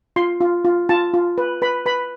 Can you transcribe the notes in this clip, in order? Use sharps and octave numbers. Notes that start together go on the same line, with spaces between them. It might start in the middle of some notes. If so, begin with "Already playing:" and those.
F4 C6
F4
F4
F4 A5
F4
B4
B4 B5
B4 B5